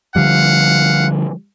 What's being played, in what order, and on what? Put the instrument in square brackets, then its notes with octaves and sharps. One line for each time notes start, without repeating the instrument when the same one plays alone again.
[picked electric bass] D3 F3 G3 [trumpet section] F5 F#5